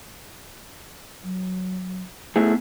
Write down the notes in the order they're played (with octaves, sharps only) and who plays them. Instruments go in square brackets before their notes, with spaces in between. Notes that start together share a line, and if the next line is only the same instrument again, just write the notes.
[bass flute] F#3
[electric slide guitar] A3 E4 G#4 [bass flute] B3